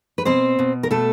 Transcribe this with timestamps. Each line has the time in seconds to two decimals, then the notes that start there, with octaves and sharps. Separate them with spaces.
0.18 B4
0.25 B2 C4 C5
0.59 B2
0.83 A#4
0.91 B2 A3 A4